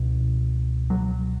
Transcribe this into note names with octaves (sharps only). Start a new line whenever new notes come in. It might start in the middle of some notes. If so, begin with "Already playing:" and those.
Already playing: C#2 B2
F#3